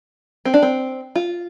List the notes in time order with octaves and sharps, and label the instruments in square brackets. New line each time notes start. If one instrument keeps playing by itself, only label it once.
[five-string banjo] C4
D4
C4
F4